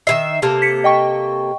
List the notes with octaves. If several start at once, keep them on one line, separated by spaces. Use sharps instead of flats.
D#3 E3 E5 C7
C3 A#3 A4
B6 C#7
D#5 G5 C#6